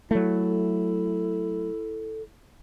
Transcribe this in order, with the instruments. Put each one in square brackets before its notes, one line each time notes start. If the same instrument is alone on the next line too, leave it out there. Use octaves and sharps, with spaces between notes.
[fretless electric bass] F#3 A3 [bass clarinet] E4 [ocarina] A4